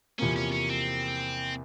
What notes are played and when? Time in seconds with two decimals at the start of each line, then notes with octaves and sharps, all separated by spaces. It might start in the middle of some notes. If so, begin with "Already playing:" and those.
0.19 E2 C3 F3 A#3 C#4
0.36 C#4
0.52 C#4
0.70 C4